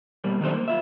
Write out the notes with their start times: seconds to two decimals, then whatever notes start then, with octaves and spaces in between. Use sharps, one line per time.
0.24 B2 G3 A#3
0.41 D#3 F#3 G3 D4 A4 C5
0.54 A#3
0.68 F4 E5